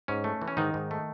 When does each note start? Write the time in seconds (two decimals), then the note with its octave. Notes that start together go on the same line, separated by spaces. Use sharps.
0.08 G#2 C#4
0.24 A3
0.42 E3
0.48 C#4
0.57 G#2 D#3 D#4
0.74 G#2
0.91 A3